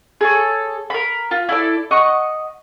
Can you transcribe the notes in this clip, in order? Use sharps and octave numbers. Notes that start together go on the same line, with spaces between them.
G#4 A4 C#5
A#4 B5
F4
E4 A4 D5
D#5 F#5 C#6